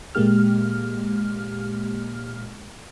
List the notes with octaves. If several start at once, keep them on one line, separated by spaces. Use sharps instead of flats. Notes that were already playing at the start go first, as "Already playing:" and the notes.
A#2 G#3 A#3 G4 F6